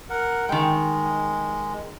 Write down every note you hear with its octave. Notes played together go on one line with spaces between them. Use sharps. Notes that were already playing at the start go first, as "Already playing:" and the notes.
A#4 F#5
D#3 G#3 G5